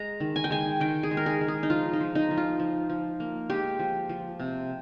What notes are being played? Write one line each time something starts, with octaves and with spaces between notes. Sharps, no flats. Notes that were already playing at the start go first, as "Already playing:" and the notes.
Already playing: G#3 A#5
D#3
G#5
G5
G#3 G#5
D#3 G5
G#4
G#3
A#4
G#4
G#3
G#4
D#4
F3 F4
D#4
F3
D#4
F3
F4
F3
F3
A#3
G#3 G4
F3
F3
C3